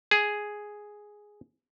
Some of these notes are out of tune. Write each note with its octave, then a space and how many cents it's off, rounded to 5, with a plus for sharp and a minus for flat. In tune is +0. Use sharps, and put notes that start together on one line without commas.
G#4 +0